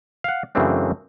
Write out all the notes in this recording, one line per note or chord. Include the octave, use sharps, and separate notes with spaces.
F5 F#5
F#2 C#3 E3 A3 C4 D4